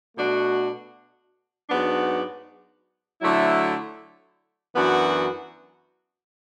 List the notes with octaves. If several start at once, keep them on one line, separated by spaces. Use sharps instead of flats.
B2 A3 D4 F#4
G#2 F#3 B3 D4 F#4
D3 F#3 A3 E4
F#2 E3 B3 D4 F#4